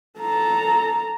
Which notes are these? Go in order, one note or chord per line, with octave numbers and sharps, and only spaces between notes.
A4 A#5